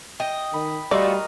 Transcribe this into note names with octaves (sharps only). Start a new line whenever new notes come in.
D#5 G5
D#3 B5
G3 A3 F4 F#4 A#4 D5 D#5